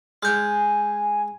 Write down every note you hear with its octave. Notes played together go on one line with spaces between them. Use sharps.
G#3 G#5 F6 G6